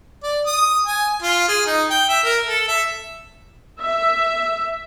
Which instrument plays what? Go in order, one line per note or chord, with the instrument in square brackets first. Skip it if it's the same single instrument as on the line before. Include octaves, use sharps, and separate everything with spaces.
[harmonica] D5
D#6
G#5
F4
G#4
D#4
G5
E5
A#4
A4
E5
[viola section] E5